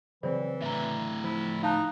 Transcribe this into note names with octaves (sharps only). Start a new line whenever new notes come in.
C#3 E3 F#3 C4 C5 D5
A2 D3 E5 A#5
F3 E4
D#4 F5 A5 F#6